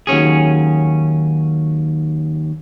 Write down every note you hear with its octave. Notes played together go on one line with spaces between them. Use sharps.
D#2 F#3 C#4 G#4